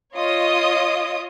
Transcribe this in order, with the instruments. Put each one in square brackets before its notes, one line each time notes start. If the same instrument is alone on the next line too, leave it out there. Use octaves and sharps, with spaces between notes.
[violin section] F4 C#5 D#5 D#6